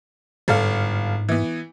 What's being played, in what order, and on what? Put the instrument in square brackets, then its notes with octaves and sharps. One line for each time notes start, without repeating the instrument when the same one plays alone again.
[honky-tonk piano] G1 A4 F5 [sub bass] G#2
[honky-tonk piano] E3 B3